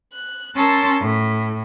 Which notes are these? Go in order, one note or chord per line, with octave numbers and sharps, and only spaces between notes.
F#6
C#4 A#4 A5 C6 E6 A6
A2